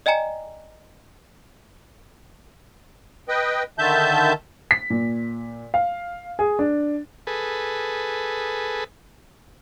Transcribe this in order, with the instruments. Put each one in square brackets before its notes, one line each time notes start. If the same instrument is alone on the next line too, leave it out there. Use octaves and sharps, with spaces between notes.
[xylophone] D5 D#5 G5 G#5 A#5 C#7
[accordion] B4 D#5 G5
D3 D#3 E5 A5 G6
[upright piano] B6
A#2
F5
G#4
D4
[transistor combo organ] G#4 A4 B4